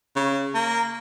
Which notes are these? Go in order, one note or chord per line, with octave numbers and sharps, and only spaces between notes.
C#3
A#3